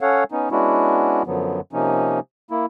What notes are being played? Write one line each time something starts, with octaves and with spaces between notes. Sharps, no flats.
C#4 A4 C#5 F5 F#5
B3 C#4 D#4
G#3 B3 C#4 D4 E4 F#4
F#2 D3 F3 F#3 B3
C3 F3 A#3 C#4 D#4
A#3 E4